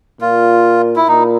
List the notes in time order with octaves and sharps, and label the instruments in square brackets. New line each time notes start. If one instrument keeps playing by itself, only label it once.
[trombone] A#2 [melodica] F4
[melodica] E4
[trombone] A#2 [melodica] D#4